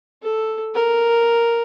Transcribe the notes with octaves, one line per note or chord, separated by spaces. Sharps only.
A4
A#4